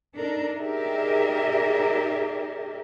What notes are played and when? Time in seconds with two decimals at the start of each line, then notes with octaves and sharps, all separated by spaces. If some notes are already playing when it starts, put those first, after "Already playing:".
0.15 D4 D#4 A4 A#4
0.57 D#4 G4 G#4 A#4 D5 E5